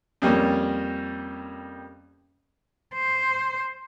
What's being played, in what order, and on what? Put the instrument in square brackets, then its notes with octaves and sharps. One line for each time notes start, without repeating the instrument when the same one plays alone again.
[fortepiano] F2 G3 A#3 C#4
[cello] C5